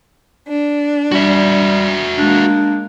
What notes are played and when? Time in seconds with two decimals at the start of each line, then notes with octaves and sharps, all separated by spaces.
0.48 D4
1.12 G3 F#4 E5
2.18 G#3 A#3 D4